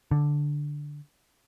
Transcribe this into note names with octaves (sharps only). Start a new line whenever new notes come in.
D3